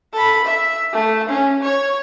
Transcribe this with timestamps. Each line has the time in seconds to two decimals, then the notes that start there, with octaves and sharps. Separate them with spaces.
0.13 A4 B5
0.44 E5
0.93 A3
1.29 C#4
1.62 C#5